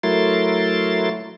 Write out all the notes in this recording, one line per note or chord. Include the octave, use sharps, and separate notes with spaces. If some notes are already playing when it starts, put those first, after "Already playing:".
F#3 A3 E4 A#4 C6 A6